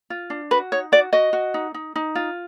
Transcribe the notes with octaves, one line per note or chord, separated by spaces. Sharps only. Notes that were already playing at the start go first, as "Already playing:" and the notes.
F4
D4
F#4 B4
D#4 C#5
F#4 D5
F#4 D#5
F#4
D#4
D#4
D#4
F4